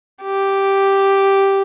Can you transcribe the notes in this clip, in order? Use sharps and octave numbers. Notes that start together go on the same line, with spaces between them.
G4